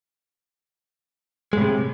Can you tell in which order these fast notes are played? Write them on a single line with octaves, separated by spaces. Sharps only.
G#3 A2 C3